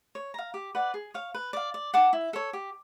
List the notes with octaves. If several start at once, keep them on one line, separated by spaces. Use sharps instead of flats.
C#5
F5 A#5
G4
B4 D5 F#5
G#4
C#5 F5
B4
D5 F5
D5
F#5 A5 D6
E4
A4 C#5
G4